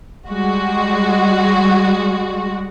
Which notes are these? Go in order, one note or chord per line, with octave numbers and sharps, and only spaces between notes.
G3 G#3 F#4